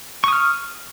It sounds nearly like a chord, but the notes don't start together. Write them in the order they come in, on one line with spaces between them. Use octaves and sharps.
C#6 D#6 F6